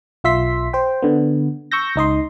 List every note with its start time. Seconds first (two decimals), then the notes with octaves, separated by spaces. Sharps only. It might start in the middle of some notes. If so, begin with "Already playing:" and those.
0.24 B1 F4 E5 C6 B6
0.73 C5 G5
1.02 D3 B3
1.72 C#6 E6 G6 A#6
1.96 C#2 D#4 D#5 C6